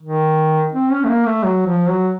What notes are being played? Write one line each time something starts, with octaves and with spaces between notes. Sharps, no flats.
D#3
C4
C#4
A3
A#3
A3
F#3
F3
F#3